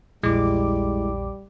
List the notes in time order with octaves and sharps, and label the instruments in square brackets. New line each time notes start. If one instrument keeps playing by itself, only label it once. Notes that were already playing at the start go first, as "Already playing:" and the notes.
[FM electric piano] A#1 E2 D6 [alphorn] G3 [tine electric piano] G#3 [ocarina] E4